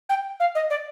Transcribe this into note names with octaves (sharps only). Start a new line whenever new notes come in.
G5
F5
D#5
D5